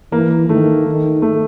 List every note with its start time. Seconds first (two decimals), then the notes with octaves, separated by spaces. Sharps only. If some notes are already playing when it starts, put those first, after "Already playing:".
0.12 E3 A#3
0.49 D#3 A3
0.87 D#3
1.22 A3